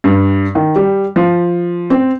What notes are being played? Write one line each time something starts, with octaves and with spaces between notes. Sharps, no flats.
G2
D#3
G3
F3
C4